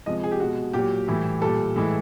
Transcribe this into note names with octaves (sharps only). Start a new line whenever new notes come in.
C3 F3 G#3 D#5
G#4
G4
B2 G#3 F#4
A#2 F#3 G4
A2 E3 G3
A#2 G3 A4
A2 E3 G#3